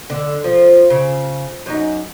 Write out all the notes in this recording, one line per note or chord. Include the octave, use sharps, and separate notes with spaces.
D3
F3
C#3
F#2 D#4